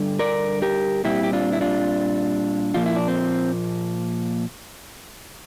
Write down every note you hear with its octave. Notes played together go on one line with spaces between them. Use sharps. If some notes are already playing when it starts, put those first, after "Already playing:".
Already playing: G2 D3 G3
A#4 D5
G4 A#4
A#2 G3 C4 E4 G4
G4
D4 F4
E4
D4 F4
A#2 F3 A#3 F4
E4
D4
C4